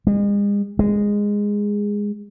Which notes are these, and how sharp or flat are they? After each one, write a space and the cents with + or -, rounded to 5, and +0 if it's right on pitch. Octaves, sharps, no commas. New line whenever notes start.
G#3 -40
G#3 -15